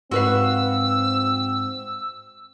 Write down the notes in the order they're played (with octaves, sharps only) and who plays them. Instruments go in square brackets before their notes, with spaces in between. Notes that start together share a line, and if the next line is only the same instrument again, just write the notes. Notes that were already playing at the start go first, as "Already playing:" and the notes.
[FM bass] G#2 [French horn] C4 [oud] F#4 B4 F5 [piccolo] E6